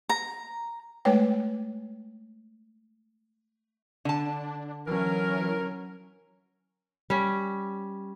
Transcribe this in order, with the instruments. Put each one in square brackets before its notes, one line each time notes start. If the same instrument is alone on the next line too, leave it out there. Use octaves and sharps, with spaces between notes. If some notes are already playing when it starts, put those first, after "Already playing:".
[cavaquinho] A#5
[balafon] G#3 A3 B4 C#5 G5
[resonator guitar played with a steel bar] D3 A5 [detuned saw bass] D4
[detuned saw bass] E3 [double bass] F#3 C#4 [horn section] A#4
[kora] G3 C#4